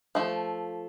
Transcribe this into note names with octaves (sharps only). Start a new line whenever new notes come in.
F3 A3